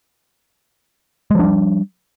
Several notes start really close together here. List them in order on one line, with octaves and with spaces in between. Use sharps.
G#3 F3 D4 G3